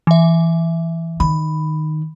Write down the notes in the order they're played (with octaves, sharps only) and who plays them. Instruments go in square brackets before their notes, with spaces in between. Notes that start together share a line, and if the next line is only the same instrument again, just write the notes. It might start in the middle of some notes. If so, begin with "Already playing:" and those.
[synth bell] E3 E5
[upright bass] D#3 [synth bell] B5